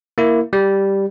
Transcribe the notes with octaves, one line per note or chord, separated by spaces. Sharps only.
A#3 E4
G3